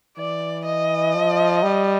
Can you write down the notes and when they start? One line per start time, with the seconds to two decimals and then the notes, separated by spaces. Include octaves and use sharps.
0.18 E3 D5
0.66 D#5
1.15 F3
1.63 G3